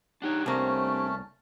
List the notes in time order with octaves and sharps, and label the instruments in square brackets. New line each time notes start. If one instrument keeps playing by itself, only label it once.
[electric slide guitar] D4 G4 C#5 [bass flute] D#4 [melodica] F#5
[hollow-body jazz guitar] C2 A#3 [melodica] A3 C#4 A5 [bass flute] C4